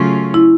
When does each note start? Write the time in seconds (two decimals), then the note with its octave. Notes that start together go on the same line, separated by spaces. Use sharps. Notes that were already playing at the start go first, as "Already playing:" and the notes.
Already playing: C#3 F#3 A3 C#4 F4
0.34 E4